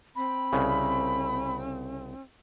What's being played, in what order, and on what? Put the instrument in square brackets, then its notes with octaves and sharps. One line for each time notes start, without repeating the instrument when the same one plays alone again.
[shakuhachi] C4 [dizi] B5
[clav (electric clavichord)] C2 C#3